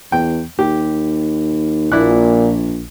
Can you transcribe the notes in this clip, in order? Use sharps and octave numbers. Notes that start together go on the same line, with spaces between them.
E2 G5
D#2 G4
A#1 A#2 E4 D5 F#6